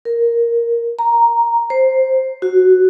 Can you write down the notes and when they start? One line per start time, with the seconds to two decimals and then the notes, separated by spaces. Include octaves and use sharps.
0.05 A#4
0.99 A#5
1.70 C5
2.42 F#4